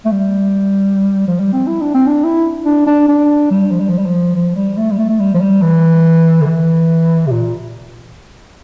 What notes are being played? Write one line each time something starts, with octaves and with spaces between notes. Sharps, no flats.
A3
G3
F3
G3
C4
E4
D4
C4
D4
E4
D4
D4
D4
G3
F3
G3
F3
G3
F3
F3
G3
A3
G3
A3
A3
G3
F3
G3
E3
D3
E3
C3
A#2